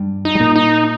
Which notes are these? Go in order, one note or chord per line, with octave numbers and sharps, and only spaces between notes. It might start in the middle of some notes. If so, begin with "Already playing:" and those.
Already playing: G2 G3
D#4
G3
A#2 A#3
D#4